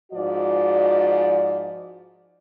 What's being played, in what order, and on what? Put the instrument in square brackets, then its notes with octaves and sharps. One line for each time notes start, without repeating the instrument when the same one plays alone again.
[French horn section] G#2 F3 F#4 D5